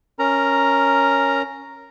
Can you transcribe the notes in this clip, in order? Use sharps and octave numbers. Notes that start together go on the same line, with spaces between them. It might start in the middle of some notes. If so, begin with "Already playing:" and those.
C#4 A#4 A#5